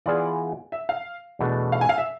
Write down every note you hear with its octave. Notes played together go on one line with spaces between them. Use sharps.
E3 B3 F4 G#4 D5
E5
F5
E2 B2 A3 D4
F5
G#5
F5
E5